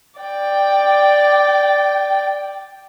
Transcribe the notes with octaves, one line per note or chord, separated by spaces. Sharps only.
D5 G5